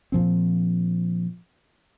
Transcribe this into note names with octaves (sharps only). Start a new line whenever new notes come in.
A#2 F3 C4